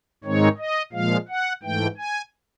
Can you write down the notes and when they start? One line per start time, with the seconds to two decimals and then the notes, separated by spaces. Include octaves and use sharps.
0.24 G#2 D#3 G#3 C4 D#4 C#5
0.58 D#5
0.93 A#2 F3 G#3 F5
1.29 F#5
1.63 G#2 E3 A3 G5
1.97 G#5